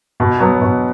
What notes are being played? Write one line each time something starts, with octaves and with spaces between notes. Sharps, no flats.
B2
F#3 B3
B2